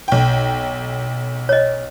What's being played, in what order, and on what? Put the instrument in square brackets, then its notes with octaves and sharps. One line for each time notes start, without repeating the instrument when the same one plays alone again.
[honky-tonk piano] B1 G5
[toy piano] C#5 D#5